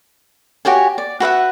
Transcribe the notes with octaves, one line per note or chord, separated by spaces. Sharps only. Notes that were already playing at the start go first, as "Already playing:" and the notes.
F#4 G4 C#5 G#5
D5
F#4 B4 E5 F#5